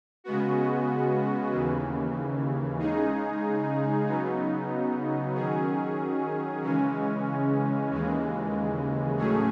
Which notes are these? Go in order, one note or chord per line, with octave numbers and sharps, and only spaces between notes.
C#3 G#3 B3 F#4
D#2 C#3 E3
C#3 G#3 D#4 G#4
C#3 F#3 B3 D#4
D#3 F#3 C#4 G#4
C#3 E3 G#3 C#4
D#2 C#3 E3 G#3
A2 F#3 A3 C#4 G#4